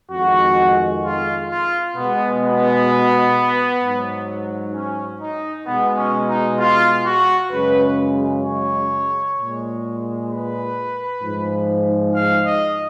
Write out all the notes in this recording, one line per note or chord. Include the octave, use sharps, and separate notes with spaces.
F2 D#3 G#3 F#4
F4
F4
B2 G#3 B3
B3
G#2 F#3
C#4
D#4
B2 G#3 B3
C#4
D#4
F4
F#4
F#2 C#3 G#3 B4
C#5
A#2 G#3
B4
G#2 F3 G#3
F5
D#5